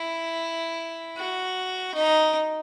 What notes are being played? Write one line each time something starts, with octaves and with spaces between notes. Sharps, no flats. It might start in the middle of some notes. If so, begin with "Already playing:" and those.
Already playing: E4
F#4
D#4